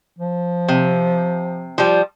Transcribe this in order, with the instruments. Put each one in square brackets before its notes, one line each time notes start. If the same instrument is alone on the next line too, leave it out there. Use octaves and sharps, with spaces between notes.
[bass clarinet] F3
[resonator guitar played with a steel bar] C3
F3 G3